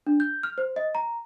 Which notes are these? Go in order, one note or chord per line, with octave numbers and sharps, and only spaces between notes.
D4
G6
F6
C5
D#5
A#5